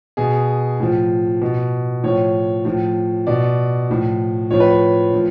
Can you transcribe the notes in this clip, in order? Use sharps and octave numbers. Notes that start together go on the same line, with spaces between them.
B2 G#4
A2 F3
B2
A2 F3 C#5
A2 F3
B2 D5
A2 F3
A2 F3 C#5
B4
C#5
A2 F3